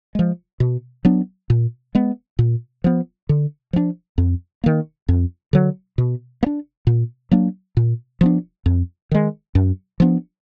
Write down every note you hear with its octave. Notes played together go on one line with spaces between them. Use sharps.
F3 G#3
B2
F#3 B3 D4
A#2
G#3 B3
A#2
F3 B3
D3
F3 B3 D4
F2
D#3 A#3
F2
D3 F#3
B2
A#3
D4
A#2
F#3 A#3 D4
A#2
F3 B3 D4
F2
D#3 G#3
F#2
F3 B3 D4